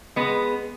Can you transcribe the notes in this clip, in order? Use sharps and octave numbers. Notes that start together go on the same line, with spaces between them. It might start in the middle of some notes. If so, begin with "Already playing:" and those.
G#3 B3